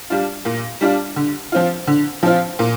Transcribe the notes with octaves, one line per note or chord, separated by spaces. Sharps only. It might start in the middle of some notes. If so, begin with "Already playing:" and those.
G3 D4 F4
A#2
G3 D4 F4
D3
F3 C4 F4
D3
F3 C4 F4
A#2